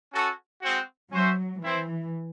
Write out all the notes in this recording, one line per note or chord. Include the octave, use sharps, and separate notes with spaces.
C#4 F#4 A4
G#3 C4 F#4
F#3 C#4 F#4 C5 E5
E3 C4 E4 C5